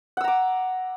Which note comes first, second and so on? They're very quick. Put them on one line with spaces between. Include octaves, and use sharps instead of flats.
F#5 E6 A#5 D6